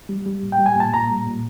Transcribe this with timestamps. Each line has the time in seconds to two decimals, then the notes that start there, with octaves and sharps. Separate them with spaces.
0.09 G3
0.26 G3
0.43 A#2
0.52 G5
0.59 G3
0.66 G#5
0.76 A#2 A5
0.94 A#2 A#5
1.09 G3
1.27 A#2